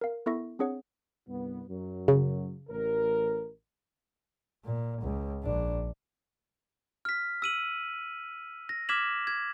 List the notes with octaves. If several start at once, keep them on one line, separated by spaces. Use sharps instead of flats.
A#4 F5
B3 E4 A4 E5 C#6 A#6
C4 D4 G#4 C#5 F#5
C2 G2 B3
F#2 F#3
C#3
A1 A#4
A#2
C#2
A#1 D4
F6 B6
E6 D#7 F#7
A#6
D6 F6 G#6 B6 E7 F#7
G#6